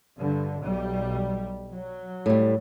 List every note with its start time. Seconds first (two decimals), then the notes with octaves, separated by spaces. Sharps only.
0.17 G2 D3
0.60 B1 G3
1.72 F#3
2.26 A2 G3